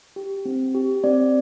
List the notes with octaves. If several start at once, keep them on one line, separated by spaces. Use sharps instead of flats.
G4
C4
G4
C4 D5